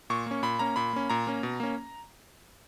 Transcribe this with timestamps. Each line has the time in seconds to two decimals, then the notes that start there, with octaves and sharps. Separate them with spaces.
0.10 A#2 C#6
0.26 A#3 C#4
0.43 A#2 B5
0.59 A#3 C#4 A#5
0.76 A#2 B5
0.93 A#3 C#4
1.10 A#2 A#5
1.27 A#3 C#4
1.43 B2
1.60 A#3 C#4